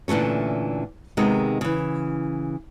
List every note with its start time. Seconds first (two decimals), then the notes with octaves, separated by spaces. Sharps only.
0.08 A#2 D3 E3 A3 C#4
1.17 C3 D#3 G#3 B3 D#4
1.61 C#3 E3